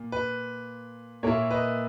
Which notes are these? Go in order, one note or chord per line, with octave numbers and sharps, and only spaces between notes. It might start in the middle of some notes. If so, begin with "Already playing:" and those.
Already playing: A#2
B4
A#2 A#3 E4 A#4 C#5
B4 D#5